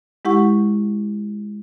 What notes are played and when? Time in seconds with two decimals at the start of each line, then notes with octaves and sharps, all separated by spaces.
0.25 G#3 E4 G4 F#5 C#6